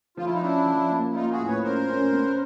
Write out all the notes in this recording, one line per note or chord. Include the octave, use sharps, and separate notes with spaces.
F3 F4
E4
D#4
C#4 D4 E4
F3
A#3
E4
A#3 D#4 F4
F#4 G#4
A2
B4 C#5
C#4 A#4 C5
C#4
B3